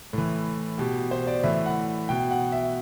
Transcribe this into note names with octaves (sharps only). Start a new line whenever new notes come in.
A2 E3
B2 G4
C5
D5
A2 E3 E5
F#5
B2 G5
F#5
E5